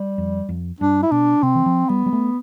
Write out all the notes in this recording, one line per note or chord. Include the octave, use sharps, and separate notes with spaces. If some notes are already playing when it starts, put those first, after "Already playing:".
Already playing: G3
F2
F2
G2 D4
E4
B2 D4
C3 C4
E3
F3
G3 B3
G3
A3